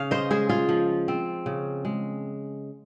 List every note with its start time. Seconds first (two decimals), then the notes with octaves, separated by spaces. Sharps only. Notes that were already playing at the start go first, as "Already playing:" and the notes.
Already playing: C#3 F5
0.11 C5 D#5
0.30 G#3 G#4 C5
0.49 F4 G#4
0.69 F3
1.08 C4
1.46 C#3
1.85 G#3